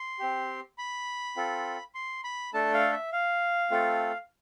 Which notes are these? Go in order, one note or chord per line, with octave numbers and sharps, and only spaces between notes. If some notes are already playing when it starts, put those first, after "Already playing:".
Already playing: C6
C4 G4
B5
C4 F4 A4
C6
B5
A3 D4 A4 A5
F5
E5
F5
A3 C4 F4 A4